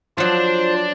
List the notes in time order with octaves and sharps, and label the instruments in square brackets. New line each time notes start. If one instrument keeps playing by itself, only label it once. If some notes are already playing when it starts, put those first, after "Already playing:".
[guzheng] F3 F#3 [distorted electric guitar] D4 [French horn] F4 [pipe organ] C5